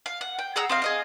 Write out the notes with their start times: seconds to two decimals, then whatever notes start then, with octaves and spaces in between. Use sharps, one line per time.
0.06 F5
0.21 F#5
0.39 G5
0.56 G#4 F#5 A#5 E6
0.69 C4 D#5 F5
0.82 G#4 D#5 F5